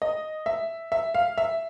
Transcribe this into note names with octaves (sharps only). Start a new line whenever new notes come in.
D#5
E5
E5
F5
E5